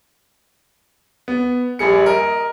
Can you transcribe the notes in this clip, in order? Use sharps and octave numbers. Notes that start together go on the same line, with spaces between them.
B3
A#1 G3 G#4 C#7
A#4 D#5